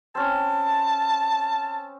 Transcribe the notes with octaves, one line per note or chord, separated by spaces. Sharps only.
C4 C#4 A5